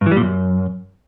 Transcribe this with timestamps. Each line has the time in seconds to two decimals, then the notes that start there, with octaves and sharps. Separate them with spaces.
0.01 G2
0.06 E3
0.11 G3
0.17 A#2
0.22 F#2